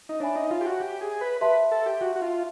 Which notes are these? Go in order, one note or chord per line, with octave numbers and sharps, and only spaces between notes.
D#4
D4 C#5 E5 G#5 B5
D#4
F4
G4
F#4
G4
G#4
B4
G4 B4 C5 E5 A5 C6
A4
G4
F#4
F#4
F4